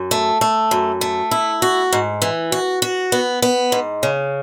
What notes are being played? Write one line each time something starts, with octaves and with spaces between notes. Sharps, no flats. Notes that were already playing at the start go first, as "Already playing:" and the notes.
Already playing: F#2
A3
A3
F#2
A3
E4
F#4
G#2
E3
F#4
F#4
B3
B3
G#2
C#3